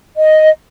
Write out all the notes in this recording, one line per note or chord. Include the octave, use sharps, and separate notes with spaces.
D#5